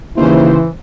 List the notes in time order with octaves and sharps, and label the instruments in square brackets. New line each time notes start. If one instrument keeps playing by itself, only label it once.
[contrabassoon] D#2 [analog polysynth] C#3 C5 [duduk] E3 [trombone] E4